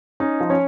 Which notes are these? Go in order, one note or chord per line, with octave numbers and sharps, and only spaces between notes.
C#4 D#4 D#5
F3
C#4 C#5